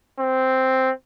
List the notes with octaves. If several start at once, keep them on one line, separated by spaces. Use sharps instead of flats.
C4